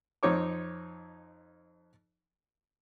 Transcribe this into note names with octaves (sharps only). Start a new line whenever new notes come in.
F2 C4 D#4 C#5 D6